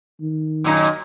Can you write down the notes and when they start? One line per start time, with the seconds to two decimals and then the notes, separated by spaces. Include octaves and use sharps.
0.21 D#3
0.64 F#2 A#2 D#4